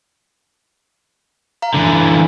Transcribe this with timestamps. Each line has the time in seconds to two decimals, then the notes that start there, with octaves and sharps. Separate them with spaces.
1.62 F5 A#5
1.74 D3 E3